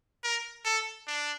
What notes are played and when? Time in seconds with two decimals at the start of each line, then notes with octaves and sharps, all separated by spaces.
0.23 A#4
0.65 A4
1.07 D4